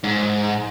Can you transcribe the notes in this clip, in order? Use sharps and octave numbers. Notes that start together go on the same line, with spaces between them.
G#2